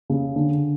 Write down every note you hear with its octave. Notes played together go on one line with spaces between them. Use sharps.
C#3
D3